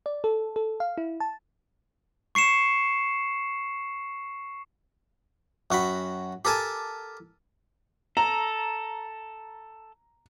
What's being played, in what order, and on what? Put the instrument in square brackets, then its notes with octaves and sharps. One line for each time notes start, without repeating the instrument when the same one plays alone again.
[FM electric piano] D5
A4
A4
F5
E4
A5
[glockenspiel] C#6 C7 C#7 E7
[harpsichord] F#2 F#4 G5 B5
G4 A4 A#4 G#5 A5
[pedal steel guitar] A4 [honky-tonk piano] A#5